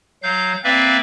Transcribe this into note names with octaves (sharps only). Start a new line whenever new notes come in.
F#3 F5 G6
A#3 C4 B4 D5 E5 F5